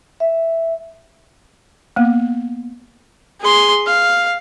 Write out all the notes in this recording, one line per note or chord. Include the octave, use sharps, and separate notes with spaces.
E5
A#3 B3
G#4 C6
F5